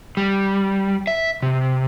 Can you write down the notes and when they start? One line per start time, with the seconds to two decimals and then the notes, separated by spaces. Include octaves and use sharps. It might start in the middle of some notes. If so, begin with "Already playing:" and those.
0.17 G3
1.07 E5
1.42 C3